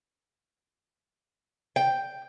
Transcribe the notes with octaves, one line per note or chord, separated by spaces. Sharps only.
G5